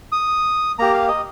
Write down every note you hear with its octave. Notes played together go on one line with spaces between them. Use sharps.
D#6
A#3 G4 A#5
F5
D#5